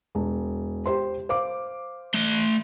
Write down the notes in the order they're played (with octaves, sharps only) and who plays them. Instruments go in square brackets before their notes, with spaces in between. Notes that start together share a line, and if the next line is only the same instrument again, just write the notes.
[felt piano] E1
G4 C5 C6
C5 F5 D6
[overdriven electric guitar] A3 C6